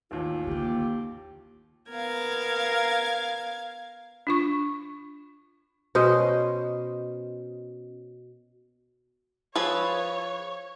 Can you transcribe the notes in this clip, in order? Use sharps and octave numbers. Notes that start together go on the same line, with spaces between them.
A1 D#2 F4
D3 A#3 G4
B3 A#4 F5 G#6
D4 F4 C#6
B2 C#4 C5 D#5
F3 G#4 B4 C#5 F5 A5 E6